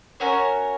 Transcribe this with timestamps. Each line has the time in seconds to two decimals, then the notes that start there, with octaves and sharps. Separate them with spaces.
0.20 C#4 F#4 A#4 C#5